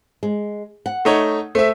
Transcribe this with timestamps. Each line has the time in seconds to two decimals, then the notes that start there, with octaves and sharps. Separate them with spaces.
0.23 G#3
0.86 F#5
1.05 A3 D#4 C#5
1.55 A3 C5 E5